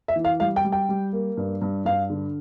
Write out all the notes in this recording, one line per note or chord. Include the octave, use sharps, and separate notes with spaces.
E5
E3
F5
G3 F5
G5
G3
G5
G3
A#3
G2
G2
G2 F5
D3